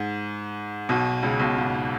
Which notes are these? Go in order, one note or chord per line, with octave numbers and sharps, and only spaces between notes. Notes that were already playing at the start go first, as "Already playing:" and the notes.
Already playing: G#2
B1 B2
C#2 C#3
B1 B2
G#2